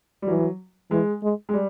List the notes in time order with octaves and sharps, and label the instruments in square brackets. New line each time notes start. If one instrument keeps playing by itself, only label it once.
[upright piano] G3
[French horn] E3 [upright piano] F#3
[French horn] E3 [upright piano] G#3
[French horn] G#3
[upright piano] G#3
G3